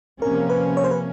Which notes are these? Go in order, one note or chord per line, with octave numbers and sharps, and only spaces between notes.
C3 F3 A#3 C#4 A#4
B4
C#5
C5
B4